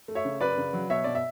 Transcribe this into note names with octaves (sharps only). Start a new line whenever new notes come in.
A3
C#5 E5
C#3
F#2 B4 D5
C#3
F#3
B2 C#5 E5
B2 D5
E5